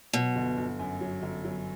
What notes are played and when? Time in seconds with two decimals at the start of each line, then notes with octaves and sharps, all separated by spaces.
0.13 B2 F#3
0.36 G1
0.57 G1
0.79 F#2
1.01 F#3
1.22 G1
1.44 F#3